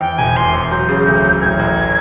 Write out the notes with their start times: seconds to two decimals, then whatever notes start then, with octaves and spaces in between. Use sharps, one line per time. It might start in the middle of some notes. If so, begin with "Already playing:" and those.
0.01 E2 G5
0.18 E1 G#5
0.36 E2 C6
0.54 E2
0.71 F#3 G6
0.89 C#3
1.07 D2
1.24 F#3
1.41 A1 G#6
1.59 A1